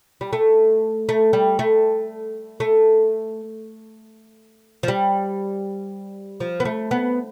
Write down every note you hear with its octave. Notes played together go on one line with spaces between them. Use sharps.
G3
A3
A3
G3
A3
A3
F3
G3
F3
B3
A3
B3